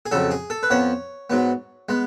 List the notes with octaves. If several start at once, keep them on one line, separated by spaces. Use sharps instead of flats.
G#4
F2 C#3 F#3 A4
G#4
A4
B4
F2 F3 B3 C#5
G#2 F#3 B3
G#3 B3